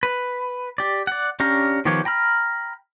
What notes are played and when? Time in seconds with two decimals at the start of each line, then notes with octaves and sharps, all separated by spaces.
0.03 B4
0.78 G4 D5
1.07 D5 F#5
1.40 C#4 D4 G4 F5 A#5
1.85 D#3 F3 B3 G4 C#5
2.05 G5 A#5 B5 F6